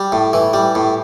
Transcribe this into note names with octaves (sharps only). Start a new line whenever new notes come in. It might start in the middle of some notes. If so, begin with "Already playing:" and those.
Already playing: G3
A2
E3
G3
A2